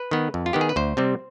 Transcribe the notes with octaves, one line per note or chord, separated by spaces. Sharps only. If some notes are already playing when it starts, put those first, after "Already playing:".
Already playing: B4
D#3 B3
F2
F4
D#3 B3 G4
G#4
B4
D2 C5
C3 G3 C4